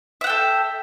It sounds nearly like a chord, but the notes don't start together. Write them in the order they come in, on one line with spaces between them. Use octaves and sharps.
E5 F#5 G5 A4